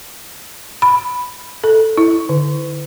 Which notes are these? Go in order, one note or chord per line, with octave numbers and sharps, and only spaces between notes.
B5
A4
E4
D3